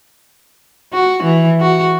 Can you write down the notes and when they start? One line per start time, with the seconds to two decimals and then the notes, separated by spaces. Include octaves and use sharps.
0.93 F#4
1.23 E3
1.60 F#4